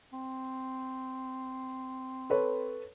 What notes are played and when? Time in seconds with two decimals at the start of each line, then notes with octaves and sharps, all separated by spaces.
0.13 C4
2.30 A4 B4 C#5